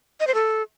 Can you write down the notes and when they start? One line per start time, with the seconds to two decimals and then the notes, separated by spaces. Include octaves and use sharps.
0.20 D#5
0.27 C5
0.34 A4